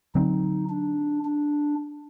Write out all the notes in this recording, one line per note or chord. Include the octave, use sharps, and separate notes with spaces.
D3 F#3 C4 D#4
D4
D4